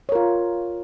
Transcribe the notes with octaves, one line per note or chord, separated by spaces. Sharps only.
F4 A#4 C#5